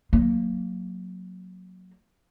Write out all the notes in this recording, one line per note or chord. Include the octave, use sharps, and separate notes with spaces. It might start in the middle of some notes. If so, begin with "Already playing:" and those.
F#3 A#3